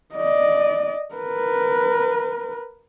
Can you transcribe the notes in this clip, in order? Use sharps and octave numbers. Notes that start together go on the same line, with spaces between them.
D5 D#5
A#4 B4